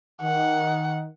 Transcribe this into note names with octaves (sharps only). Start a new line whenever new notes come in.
D#3 F#5